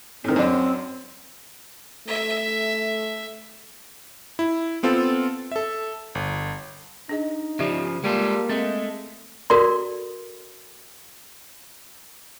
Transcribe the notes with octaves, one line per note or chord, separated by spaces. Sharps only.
A2 D#3 C4
F#2 D4
A3 E5
E4
B3 C4 F4 A4
A4 E5
G1
D4 D#4 G#4 D#5
C#3 F3 G4 D5 E5
G3 G#3 A#3 F4 A4
G#3 A3 C4
F#4 A4 A#4 D5 C6